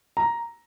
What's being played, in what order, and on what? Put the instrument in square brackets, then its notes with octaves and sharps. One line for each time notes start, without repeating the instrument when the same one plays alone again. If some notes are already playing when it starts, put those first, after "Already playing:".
[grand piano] A#5